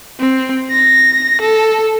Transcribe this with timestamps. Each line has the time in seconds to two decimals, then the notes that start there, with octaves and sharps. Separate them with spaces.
0.20 C4
0.71 A#6
1.41 A4